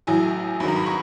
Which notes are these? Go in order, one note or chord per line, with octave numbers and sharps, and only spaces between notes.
A1 A2 F#3 G#5
G#1 G2 D#3 F#3 B5
A#5
B5
C#6